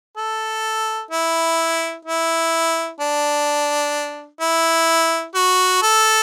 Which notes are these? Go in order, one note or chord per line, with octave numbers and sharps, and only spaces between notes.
A4
E4
E4
D4
E4
F#4
A4